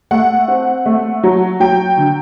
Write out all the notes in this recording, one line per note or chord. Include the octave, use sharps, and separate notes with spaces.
A3 F#5
C4
A3
F#3
F#3 G5
D3